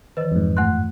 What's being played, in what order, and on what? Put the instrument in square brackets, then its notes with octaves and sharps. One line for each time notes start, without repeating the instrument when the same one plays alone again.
[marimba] D#3 E3 [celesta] B4 D#5
[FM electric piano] F2 G#2
[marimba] G2 A3 C6 [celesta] F#5 F#6